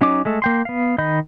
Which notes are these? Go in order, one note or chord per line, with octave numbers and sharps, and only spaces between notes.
F#3 C#4 D#4 D6
G#3 A3 A4
A#3 G5 C6
B3 F5
D#3 D#5 B5 G6